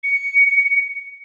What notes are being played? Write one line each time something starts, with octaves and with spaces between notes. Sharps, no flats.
C#7